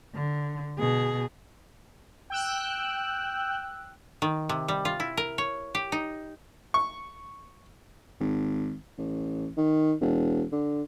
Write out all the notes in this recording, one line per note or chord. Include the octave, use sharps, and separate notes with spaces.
D3
B2 G#4
G5 E6 F#6
D#3
C3
G3
F4
E4
A#4
C#5
G4
D#4
C#6
G#1
A1
D#3
E1
D3